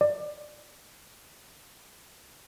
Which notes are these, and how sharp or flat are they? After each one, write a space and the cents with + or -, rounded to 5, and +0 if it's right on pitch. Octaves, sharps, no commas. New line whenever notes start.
D5 +25